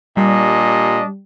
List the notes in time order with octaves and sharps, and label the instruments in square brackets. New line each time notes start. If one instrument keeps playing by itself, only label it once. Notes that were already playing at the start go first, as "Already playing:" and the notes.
[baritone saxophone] A#2 [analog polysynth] G3 [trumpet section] D4 D#5